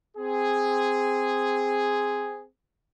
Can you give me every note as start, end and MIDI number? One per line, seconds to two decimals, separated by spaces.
0.17 2.45 60
0.17 2.45 68